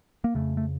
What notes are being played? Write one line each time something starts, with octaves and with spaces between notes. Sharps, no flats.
A#3
F2 C#3 A3
A3